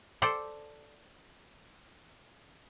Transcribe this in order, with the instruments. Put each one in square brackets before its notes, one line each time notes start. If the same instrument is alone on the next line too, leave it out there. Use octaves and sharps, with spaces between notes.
[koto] A4 C5 D5 A5